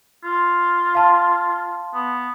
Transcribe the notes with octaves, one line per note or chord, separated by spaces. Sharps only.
F4
F5 A5 C6
B3